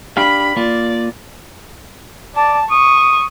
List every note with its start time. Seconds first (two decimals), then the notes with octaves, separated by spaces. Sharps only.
0.17 D4 G4 F5 B5
0.56 A#3 F4 D5
2.36 D5 A5
2.70 C#6 D#6